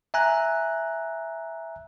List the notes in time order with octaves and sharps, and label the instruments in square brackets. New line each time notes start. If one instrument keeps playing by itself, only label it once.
[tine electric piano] E5 G#5 A#5 F#6